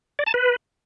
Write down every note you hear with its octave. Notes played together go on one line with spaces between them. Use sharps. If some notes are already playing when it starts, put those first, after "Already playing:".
D5
A5
B4